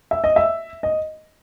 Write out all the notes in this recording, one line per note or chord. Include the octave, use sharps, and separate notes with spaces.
E5
D#5
E5
D#5